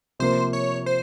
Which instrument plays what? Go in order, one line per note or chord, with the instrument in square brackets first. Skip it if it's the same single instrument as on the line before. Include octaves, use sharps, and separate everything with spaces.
[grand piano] C3 F3 A#3 [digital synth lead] C5
[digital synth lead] C#5
C5